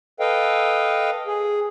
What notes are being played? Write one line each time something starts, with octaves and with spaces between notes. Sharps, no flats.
A4 B4 D#5 F5 G5
G#4